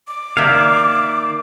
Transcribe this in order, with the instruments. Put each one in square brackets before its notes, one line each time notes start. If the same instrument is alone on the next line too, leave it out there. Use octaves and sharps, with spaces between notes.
[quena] D6
[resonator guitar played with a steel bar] D#3 A#3 [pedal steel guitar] D5 E5 F5